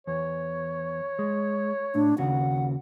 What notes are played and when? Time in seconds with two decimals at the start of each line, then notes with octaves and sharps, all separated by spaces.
0.07 E2 C#5
1.19 G#3
1.95 A2 D4
2.18 D#2 C#3 F#4 F#5